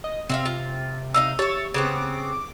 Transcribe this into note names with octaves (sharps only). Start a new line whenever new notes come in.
D#5
C3 C4 E5 F5
F4
D#4 D#5 F5 E6
G4 C#5 E5 A6
C#3 B3 C4 D6